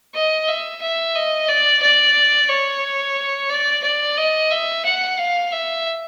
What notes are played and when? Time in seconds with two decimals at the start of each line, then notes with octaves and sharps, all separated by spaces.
0.15 D#5
0.49 E5
0.82 E5
1.16 D#5
1.48 D5
1.82 D5
2.49 C#5
3.50 D5
3.84 D5
4.17 D#5
4.51 E5
4.85 F#5
5.19 F5
5.52 E5